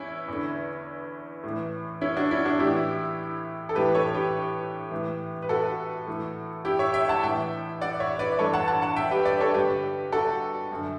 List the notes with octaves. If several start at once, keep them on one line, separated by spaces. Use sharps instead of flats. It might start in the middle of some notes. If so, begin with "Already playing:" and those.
Already playing: E2 C#4 E4
E2 D3
A2
E3
C#4 E4
D4 F#4
C#4 E4
D4 F#4
A2 E3 E4 G4
A4
A2 E3 G4 B4
A4 C#5
G4 B4
A2 E3
B4
F#4 A4
A2 E3
E4 G4
C#5 E5
E5 G5
F#5 A5
A2 E3 E5 G5
D5 F#5
C#5 E5
B4 D5
G2 E3 A4 C#5
F#5 A5
F#5 A5
F#5 A5
E5 G5
G4 B4
B4 D5
A4 C#5
G2 D3 G4 B4
F#4 A4
F#2 D3